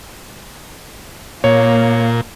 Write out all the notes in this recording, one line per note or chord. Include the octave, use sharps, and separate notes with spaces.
A#2 A#3 C#5